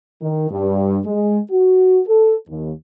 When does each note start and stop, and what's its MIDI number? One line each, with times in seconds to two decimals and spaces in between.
0.21 0.48 51
0.50 0.99 43
1.05 1.39 56
1.50 2.00 66
2.06 2.34 69
2.47 2.72 39